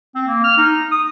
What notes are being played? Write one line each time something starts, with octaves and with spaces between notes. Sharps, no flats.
C4
A#3
F6
D#4
D#6